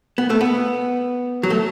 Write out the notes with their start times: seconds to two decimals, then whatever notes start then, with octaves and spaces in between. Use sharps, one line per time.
0.18 B3
0.30 A3
0.41 B3
1.43 F#3
1.50 A3